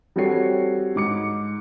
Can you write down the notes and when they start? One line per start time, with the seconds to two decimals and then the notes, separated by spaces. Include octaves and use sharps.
0.16 G3 C4 F#4 A4 C#5 C7
0.96 G#2 D6 C#7